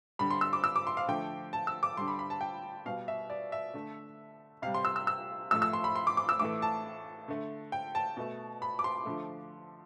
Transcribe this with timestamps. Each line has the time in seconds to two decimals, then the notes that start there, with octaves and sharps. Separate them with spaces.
0.19 D3 G3 B5
0.30 C6
0.41 E6
0.53 D6
0.64 E6
0.76 D6
0.87 C6
0.97 F5
1.08 D3 F3 A3 G5
1.53 A5
1.67 E6
1.83 D6
1.97 D3 G3 C6
2.08 B5
2.19 B5
2.30 A5
2.41 G5
2.86 B2 G3 F5
3.08 E5
3.30 D5
3.52 E5
3.74 D3 A3
4.62 C3 G3 F5
4.74 C6
4.85 E6
4.96 E6
5.07 E6
5.51 A2 F3 A3 E6
5.62 E6
5.73 C6
5.84 B5
5.96 C6
6.07 D6
6.17 D6
6.29 E6
6.39 A2 E3 A3 D6
6.62 A5
7.28 D3 A3
7.72 G5
7.95 A5
8.17 B2 A3
8.62 B5
8.79 D6
8.84 C6
9.05 D3 F3 A3